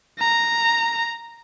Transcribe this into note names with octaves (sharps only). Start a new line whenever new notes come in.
A#5